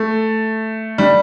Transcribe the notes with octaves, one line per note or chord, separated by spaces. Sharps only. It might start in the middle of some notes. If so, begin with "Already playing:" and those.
Already playing: A3
G3